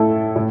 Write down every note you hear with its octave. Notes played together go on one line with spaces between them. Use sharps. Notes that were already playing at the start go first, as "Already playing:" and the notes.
Already playing: A2 A3 E4 A4
A2